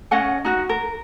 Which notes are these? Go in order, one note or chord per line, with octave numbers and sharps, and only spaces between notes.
C#4 D#5 F#5 G#5
D#4 F#4
A#4